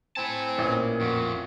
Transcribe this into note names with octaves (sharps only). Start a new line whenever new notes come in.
C4 E4 G#5 A5
A1 A#2
F2 F#4